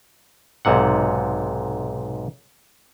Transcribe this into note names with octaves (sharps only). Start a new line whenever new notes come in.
B1 G#2 C3 F#5